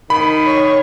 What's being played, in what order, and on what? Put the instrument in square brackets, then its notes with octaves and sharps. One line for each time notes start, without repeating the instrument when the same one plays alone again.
[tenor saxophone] D#3 [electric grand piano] B5
[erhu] C#5